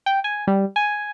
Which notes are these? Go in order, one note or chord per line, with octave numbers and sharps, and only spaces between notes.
G5
G#5
G3
G#5